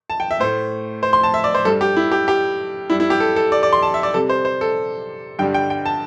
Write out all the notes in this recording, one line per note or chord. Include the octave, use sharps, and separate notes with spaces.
A5
G5
E5
A2 A3 C5
C5
C6
A5
E5
D5
C5
G2 G3 A4
G4
E4
G4
G4
G2 G3 E4
E4
G4
A4
A4
D5
D5
C6
A5
E5
D5
C3 G3 A4
C5
C5
A4
G2 D3 G3 G5
G5
G5
A5